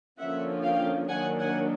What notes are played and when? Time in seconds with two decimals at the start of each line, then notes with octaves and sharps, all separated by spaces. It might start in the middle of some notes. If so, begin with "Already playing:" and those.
0.19 D3 F3 A#3 C#4 E5 F#5
0.64 F5 G5
1.09 D#3 F#3 A#3 D4 F#5 G#5
1.39 F#5 G#5